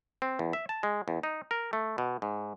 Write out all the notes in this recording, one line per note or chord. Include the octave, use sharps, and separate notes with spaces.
C4
E2
E5
A5
G#3
E2
D#4
A#4
A3
B2
G#2